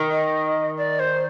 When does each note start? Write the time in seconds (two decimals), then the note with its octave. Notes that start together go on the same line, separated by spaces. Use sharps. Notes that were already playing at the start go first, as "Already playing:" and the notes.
Already playing: D#3
0.11 D#5
0.78 D5
0.99 C5